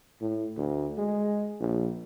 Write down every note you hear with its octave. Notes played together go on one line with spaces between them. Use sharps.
A2
D2
G#3
A#1